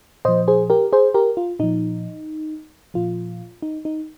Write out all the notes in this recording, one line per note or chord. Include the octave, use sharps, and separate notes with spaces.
A#2 F3 C5 D#5
G#4 C5
G4 A#4
G#4 C5
G4 A#4
F4
A#2 F3 D#4
A#2 F3 F4
D#4
D#4